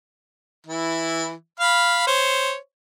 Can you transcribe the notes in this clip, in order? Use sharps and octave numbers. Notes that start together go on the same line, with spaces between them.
E3 E4
F5 B5 F6
C5 C#5